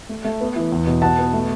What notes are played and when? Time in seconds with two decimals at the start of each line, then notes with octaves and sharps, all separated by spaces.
0.09 A3
0.25 A3
0.41 B3
0.56 E3
0.72 E2
0.87 B2
1.02 B2 F#5 A5
1.18 B3
1.33 A3